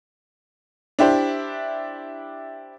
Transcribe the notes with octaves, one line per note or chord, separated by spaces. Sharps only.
D4 E4 G4 C5 D5